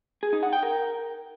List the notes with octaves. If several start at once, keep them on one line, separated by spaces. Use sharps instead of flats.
G#4
D#4
F#5
G5
A#4